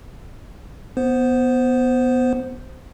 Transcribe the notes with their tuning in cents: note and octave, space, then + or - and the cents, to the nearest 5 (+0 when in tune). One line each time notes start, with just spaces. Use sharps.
B3 +0 C5 -5